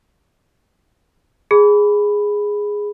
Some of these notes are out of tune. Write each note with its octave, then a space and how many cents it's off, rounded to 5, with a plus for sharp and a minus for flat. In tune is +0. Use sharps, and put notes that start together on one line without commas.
G#4 -5 B5 +0